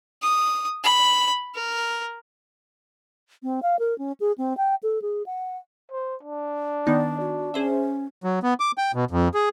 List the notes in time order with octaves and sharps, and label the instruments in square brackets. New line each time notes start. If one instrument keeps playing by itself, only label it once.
[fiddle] D#6
B5
A#4
[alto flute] C4
F5
A#4
C#4
G#4
C4
G5
A4
G#4
F#5
[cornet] C5
D4
[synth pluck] D#3 B3 D#4 [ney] D5
[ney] F#4
[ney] C#4 [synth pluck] G#4 C5 E5
[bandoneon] F#3
B3
D6
G5
B2
F2
G#4